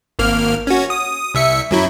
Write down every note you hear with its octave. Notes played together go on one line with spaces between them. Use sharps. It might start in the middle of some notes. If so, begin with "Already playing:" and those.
G#1 A#3 F6
C#4 F#4
D#6
C2 E5 C#7
F#2 F#3 E4